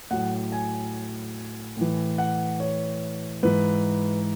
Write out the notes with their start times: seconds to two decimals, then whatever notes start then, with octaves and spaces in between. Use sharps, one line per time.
0.11 A2 F#3 F#5
0.52 G#5
1.77 A2 E3
2.18 F#5
2.60 C#5
3.43 G#2 E3 B4